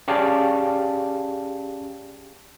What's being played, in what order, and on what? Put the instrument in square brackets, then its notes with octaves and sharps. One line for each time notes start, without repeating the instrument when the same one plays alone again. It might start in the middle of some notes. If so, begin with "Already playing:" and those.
[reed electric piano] C#4 G4 G#4 D5 F5 A5